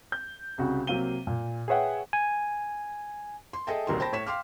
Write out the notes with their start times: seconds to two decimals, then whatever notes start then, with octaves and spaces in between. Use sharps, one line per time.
0.12 G6
0.58 C2 C#3 F#4
0.87 C3 F#3 A#3 F5 D#7 G7
1.27 A#2
1.68 G#4 B4 C#5 E5 F#5 G5
2.13 G#5
3.53 C6
3.67 G#4 A4 D#5 E5 G5 A5
3.87 D#1 C2 D#3 F#4 A#4 C6
4.00 C5 G5 A5 B5 A#6
4.12 A2 C#5 B6 E7
4.26 F5 G5 C6 D6 F6